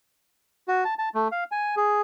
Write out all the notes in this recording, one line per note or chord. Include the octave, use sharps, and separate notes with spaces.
F#4
A5
A5
A3
F5
G#5
G#4